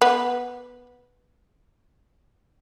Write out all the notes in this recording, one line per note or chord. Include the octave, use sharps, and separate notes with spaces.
B3